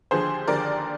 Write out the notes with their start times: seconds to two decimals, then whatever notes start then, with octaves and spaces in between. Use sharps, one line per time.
0.11 D#2 D3 F3 G#4 C5
0.47 D#2 D3 F3 A#4 D5